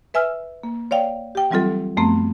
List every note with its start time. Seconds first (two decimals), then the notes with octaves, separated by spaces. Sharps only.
0.14 B4 E5 G#5 E6 F6
0.63 A#3
0.91 C#5 D5 F5 G5
1.35 G4 G5
1.51 E3 F#3 G3 C4 F4 A4
1.97 F#2 F3 A3 B3 C4